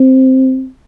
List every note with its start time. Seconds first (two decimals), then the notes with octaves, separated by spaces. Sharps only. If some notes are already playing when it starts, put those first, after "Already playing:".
Already playing: C4